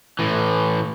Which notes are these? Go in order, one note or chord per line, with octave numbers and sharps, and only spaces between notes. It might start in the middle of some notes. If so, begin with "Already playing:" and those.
A2 E3